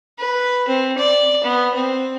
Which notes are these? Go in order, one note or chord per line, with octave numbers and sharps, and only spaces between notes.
B4
C4
D5
B3
C4